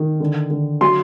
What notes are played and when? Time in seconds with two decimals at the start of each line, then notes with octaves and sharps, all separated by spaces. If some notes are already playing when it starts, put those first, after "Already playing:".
Already playing: D#3
0.20 D3
0.50 D3
0.81 F#3 C6